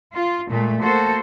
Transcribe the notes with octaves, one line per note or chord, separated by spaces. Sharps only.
F4
A#2 G#3 A3
A#3 F#4 A4 C5